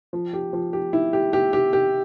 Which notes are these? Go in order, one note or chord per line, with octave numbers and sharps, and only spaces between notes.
F3
G4
F3
G4
E4
G4
G4
G4
G4